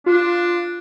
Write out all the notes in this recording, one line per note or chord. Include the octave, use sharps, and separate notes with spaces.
D4 F4